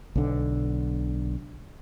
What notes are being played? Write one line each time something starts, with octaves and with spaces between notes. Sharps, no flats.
B1 D3